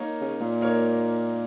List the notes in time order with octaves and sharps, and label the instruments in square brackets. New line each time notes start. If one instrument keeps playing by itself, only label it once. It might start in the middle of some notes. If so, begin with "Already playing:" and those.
Already playing: [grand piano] A#3 D#4 A#4 C#5
[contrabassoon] C#3
A#2
[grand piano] A#3 D#4 A#4 C#5